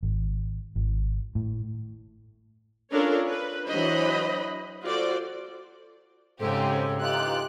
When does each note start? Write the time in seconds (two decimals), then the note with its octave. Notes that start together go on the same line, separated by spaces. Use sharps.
0.03 G#1
0.76 G#1
1.35 A2
2.92 C#4 D4 F4 A4 A#4 C#5
3.26 B4
3.68 E3 F#3 D4 C5 D#5 B5
4.84 F4 F#4 A4 C5 D5
6.40 G#2 C#3 C4 C#4 G4 A4 C5
7.01 E3 D#4 F4 G4 F#6